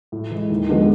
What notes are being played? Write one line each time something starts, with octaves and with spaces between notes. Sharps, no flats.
A2
E3 G#3
D#2
D3 F3 G#3 B3